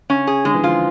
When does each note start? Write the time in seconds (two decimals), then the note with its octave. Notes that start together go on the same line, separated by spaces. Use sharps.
0.10 C#3 C#4
0.27 G#4
0.45 D3 G#3
0.54 E3
0.63 F3 F4